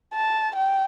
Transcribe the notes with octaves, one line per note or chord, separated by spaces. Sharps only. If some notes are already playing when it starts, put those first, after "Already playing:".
A5
G5